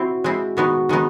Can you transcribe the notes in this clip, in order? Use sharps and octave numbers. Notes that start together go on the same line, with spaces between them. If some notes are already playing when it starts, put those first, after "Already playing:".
Already playing: C4 E4 F#4
G#3 C4 E4
D#3 G#3 B3 D#4 F#4
D#3 G#3 B3 D#4